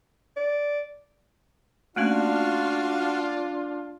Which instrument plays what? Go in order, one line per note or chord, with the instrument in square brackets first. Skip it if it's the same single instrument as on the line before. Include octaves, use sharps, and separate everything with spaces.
[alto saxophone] D5
[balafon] A3 A#3 C#4 [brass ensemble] D4 F4 [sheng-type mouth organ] F#4 F5